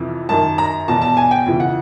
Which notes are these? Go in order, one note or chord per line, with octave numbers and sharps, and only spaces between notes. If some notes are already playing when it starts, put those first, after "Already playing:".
Already playing: F2 C3 E3
F#2 D#3 A5
A#5
E2 B2 A5
A5
G#5
G5
F2 C#3 E3
F#5